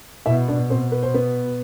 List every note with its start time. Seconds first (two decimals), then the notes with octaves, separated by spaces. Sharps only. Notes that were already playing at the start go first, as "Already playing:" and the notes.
0.26 B2 E4 E5
0.48 D4 D5
0.70 B2 C4 C5
0.92 B4
1.03 C5
1.14 B3 B4